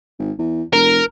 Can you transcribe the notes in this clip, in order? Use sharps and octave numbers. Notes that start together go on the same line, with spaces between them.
G#1
E2
F1 A#4